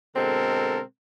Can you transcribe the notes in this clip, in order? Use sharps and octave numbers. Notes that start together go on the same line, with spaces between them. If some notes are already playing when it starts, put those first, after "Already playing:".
B2 D3 G#3 C4 A4 A#4